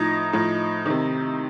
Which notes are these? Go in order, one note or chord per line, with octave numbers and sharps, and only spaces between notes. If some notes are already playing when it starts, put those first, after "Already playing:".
Already playing: A2 F3 D#4
A2 F3
C3 D#3